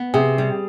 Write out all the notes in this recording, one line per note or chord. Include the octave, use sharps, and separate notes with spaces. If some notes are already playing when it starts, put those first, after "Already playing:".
Already playing: B3
C3 G#4
G3